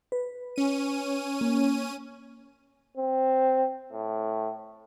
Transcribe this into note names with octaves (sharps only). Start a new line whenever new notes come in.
B4
C#4 D#7
A#3
C4
A2